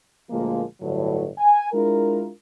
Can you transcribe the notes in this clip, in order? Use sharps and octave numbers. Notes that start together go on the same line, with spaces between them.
D2 A#2 F3 G#3 A#3
G1 A2 D3 F#3
G#5
G#3 D4 E4 F4 A#4